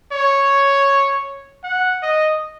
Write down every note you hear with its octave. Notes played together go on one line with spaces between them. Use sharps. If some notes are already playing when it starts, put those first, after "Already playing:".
C#5
F#5
D#5